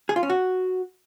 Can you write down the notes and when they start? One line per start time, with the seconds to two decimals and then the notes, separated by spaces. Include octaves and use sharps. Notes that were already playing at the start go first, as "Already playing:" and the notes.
0.09 G#4
0.16 F4
0.23 C#4
0.30 F#4